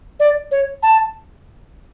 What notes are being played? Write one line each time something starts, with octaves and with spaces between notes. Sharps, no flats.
D5
C#5
A5